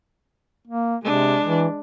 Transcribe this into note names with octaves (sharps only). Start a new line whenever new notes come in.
A#3
C3 G#3 D4
E3